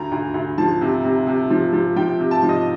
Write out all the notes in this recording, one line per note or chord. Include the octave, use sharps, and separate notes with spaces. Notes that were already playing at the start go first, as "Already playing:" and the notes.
Already playing: D2 A#5
D2
D2
F3 A5
C3
C3
C3
F3
F3
F3 G5
C3
A5
F3
D#5